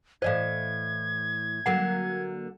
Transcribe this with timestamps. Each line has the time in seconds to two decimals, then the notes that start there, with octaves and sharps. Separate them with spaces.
0.22 A2 E3 C5 D5 D#5 F5 G#6
1.66 D3 F#3 A#3 F#5